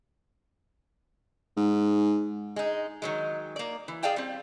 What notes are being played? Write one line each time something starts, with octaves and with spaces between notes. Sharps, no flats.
G#2
G#3 D#4
D#3 F#3 G#3
A#3 D5
E3
G#4 D5 F5 G5 A5
G3 C4